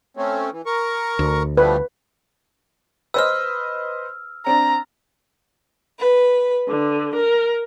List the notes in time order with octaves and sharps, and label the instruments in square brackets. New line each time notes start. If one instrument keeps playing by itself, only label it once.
[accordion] A3 C4 C#4
E3
A#4 C#6
[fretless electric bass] D2
[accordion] F3 G3 A3 [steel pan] B4
[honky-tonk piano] B4 C5 D#5 [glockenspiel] E6 F6
[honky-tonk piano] C4 D4 [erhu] A#5
[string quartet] B4
D3
A#4